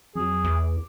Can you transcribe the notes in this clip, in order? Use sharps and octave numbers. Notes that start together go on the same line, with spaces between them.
F2 F#3 G#4
E2 D6